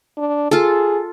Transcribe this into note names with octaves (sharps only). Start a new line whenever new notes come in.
D4
F4 G#4 A4